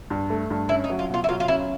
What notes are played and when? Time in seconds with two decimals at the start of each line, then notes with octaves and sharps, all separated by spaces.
0.10 G2
0.30 A3
0.50 G2
0.69 C#4 E4
0.84 D#4
0.90 F#3
0.99 F4
1.09 B2 F4
1.24 E4
1.29 F#3 F4
1.40 F4
1.48 C#4 E4